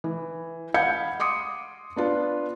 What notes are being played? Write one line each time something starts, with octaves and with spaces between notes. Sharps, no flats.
E3
F5 F#5 B5 G6 G#6 C#7
C6 D6 D#6 C#7
B3 D4 F4 B4